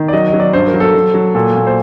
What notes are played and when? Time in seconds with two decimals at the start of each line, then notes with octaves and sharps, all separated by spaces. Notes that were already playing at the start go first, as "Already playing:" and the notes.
Already playing: D#3
0.08 D5
0.13 F#3 D#5
0.27 D#5
0.33 F#3
0.40 D5
0.53 G2 C5
0.67 A#4
0.73 F#3
0.80 A4
0.94 F#3
1.14 F#3
1.35 A#2 A4
1.55 A#2
1.67 C5